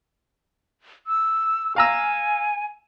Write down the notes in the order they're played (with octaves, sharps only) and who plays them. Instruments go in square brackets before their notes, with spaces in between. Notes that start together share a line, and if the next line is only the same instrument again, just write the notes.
[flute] E6
[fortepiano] F5 A#5 E6 [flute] G#5